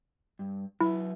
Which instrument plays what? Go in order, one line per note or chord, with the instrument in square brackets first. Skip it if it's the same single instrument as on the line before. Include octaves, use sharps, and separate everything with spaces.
[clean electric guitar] G2
[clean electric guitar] F#3 B4 E5 [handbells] E4